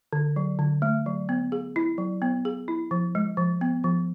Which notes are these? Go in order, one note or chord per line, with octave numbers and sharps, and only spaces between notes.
D3
F#3
D3
A3
F#3
B3
G#4
E4
F#3
B3
G#4
E4
F3
G#3
F3
B3
F3